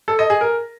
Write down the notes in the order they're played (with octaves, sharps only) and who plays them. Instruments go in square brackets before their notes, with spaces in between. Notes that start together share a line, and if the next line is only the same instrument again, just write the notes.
[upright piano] A4
D#5
G#4
A#4